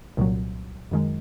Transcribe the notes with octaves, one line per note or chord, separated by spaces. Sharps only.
C2 A#2 F#3
F#2 D#3 G#3